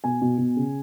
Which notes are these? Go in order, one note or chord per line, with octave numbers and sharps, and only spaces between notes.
B2 G#5
B2
B2
C#3